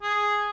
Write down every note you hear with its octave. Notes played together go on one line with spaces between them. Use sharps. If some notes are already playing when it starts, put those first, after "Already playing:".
G#4